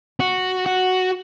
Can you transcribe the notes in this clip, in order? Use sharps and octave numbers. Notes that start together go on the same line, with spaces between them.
F#4
F#4